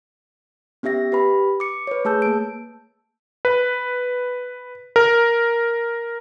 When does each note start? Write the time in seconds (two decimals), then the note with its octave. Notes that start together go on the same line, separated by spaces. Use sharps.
0.83 B3 C#4 G4 E5 A#6
1.12 G4 B4 B5
1.60 D6 C#7
1.87 B4 C#5
2.05 A3 G#4 A5 E6 G6
2.22 A#3 D7
3.45 B4
4.96 A#4